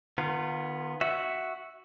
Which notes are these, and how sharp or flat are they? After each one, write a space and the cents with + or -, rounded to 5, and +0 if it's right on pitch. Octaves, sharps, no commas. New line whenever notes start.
D#3 -40 B3 +0 F4 +0
F#4 +0 E5 +0